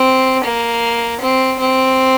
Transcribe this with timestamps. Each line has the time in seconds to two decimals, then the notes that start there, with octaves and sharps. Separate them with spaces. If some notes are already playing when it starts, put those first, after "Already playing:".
Already playing: C4
0.44 A#3
1.21 C4
1.59 C4